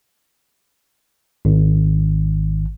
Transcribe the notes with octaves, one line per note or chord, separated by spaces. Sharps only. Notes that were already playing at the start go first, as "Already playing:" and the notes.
G#1